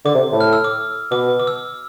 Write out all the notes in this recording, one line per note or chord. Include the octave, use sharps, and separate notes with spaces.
D3 D6
C3
A2
F6
E6
D6
B2 D6
D6
E6